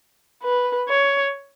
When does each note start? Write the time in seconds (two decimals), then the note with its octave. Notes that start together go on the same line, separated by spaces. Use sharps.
0.44 B4
0.89 C#5